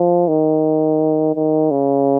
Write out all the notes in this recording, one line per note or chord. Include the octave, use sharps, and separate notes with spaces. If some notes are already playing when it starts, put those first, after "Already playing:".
Already playing: F3
D#3
D#3
C#3